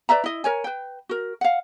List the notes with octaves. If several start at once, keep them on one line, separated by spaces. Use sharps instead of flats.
B4 D5 E5 A#5
E4 D#5
A#4 C#5 G#5
B4 G5
F#4 A#4
F5 F#5